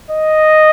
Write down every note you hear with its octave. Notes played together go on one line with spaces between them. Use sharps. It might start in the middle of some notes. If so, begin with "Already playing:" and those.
D#5